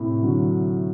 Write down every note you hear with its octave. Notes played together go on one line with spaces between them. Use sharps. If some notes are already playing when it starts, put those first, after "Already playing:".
Already playing: A2 C3
D3 F#3